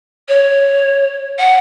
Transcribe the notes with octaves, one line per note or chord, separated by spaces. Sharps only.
C#5
F#5